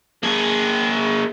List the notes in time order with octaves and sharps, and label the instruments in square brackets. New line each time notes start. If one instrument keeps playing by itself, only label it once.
[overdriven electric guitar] A#3 G#4